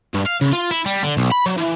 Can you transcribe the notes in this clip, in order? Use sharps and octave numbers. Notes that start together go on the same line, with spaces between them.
G2
F5
C#3
F4
E4
G3
D3
B1
B5
F#3
E3